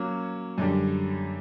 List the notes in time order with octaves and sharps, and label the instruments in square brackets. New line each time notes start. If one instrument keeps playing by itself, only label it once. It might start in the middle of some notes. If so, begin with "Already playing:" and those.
Already playing: [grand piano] F#3 A#3 C#4
F#2 D3 G3